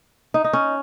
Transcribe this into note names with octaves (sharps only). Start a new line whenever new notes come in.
D#4
D#4
C#4